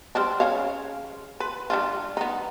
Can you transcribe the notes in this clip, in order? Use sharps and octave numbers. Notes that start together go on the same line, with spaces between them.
G3 C4 D4
C#3 C#5 F5
B4
G3 D4 F4
B3 D#4